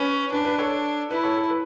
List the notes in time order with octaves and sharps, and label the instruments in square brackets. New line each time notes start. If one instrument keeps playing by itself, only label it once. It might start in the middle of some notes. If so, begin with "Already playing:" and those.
Already playing: [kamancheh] C#4 [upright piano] B4
[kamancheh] D4 [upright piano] B4
[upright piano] B4
A4 C#5
[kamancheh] E4 [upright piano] B4
[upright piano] A4 C#5
A4
B4